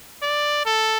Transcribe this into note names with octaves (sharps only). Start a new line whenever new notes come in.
D5
A4